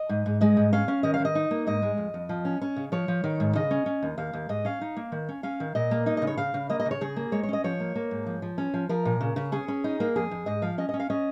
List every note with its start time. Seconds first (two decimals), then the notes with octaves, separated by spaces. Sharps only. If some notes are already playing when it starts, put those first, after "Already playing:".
Already playing: D#5
0.09 G#2
0.26 G#2
0.41 G#3 D#5
0.57 G#2
0.73 C#4 F5
0.88 C#4
1.03 D#3 D#5
1.14 F5
1.20 D#3
1.25 D#5
1.35 D#4
1.51 A#3
1.67 G#2 D#5
1.82 G#3
1.97 F2
2.14 F2
2.29 F3
2.45 C#4
2.61 C#4
2.76 C#3
2.92 F3 C#5
3.08 F3
3.24 D#3
3.40 G#2
3.55 C#3 D#5
3.71 C#4
3.86 C#4
4.03 D#2
4.18 D#2 F5
4.33 D#2
4.49 G#2 D#5
4.65 C#4 F5
4.81 D#4
4.97 A#3
5.12 D#3
5.29 C#4
5.43 C#4 F5
5.60 D#3
5.75 A#2 D#5
5.91 A#3
6.06 D#4 D#5
6.17 C#3 D#5
6.27 C#5
6.37 C#3 F5
6.54 C#3
6.70 A#3 D#5
6.80 D#5
6.86 C#3
6.91 C#5
7.01 C#3 G#4
7.16 A#3
7.32 G#3 C#5
7.43 C#5
7.49 C#4 D#5
7.64 F3 C#5
7.80 A#3
7.96 A#3
8.11 G#2
8.27 F3
8.42 F3
8.58 C#4
8.74 F3
8.89 F3 A#4
9.05 A#2
9.21 C#3
9.36 C#3
9.52 C#4 G#4
9.68 C#4
9.84 D#4
10.00 A#3
10.16 F2 G#4
10.31 F2
10.46 G#2 D#5
10.62 F3 F5
10.78 C#4 D#5
10.89 C#4 D#5
11.00 F5
11.10 C#4 D#5